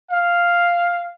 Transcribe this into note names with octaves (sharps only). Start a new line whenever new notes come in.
F5